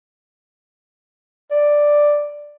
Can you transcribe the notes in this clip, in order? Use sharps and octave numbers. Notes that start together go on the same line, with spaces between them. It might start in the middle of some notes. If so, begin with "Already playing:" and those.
D5